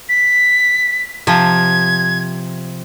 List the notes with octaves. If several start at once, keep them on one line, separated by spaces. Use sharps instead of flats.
B6
C3 F3 G#6